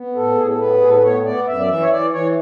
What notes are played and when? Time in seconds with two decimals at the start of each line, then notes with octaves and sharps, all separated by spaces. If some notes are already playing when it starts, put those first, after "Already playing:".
Already playing: B3
0.15 A2 A4
0.35 A2 G#4
0.47 A4
0.59 B3 B4
0.81 A2 G#4
0.88 A4
0.96 B4
1.03 B3 C#5
1.25 B3 D5
1.47 F#2 E5
1.59 D5
1.69 E3 E5
1.80 C#5
1.91 E3 D5
2.12 E3 C#5